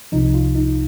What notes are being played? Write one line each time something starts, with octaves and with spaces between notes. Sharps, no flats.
C2 C3 F3 D#4
F4
D#4